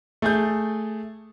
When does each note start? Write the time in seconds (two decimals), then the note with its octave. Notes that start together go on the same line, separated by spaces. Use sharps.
0.22 A3 G#4 G6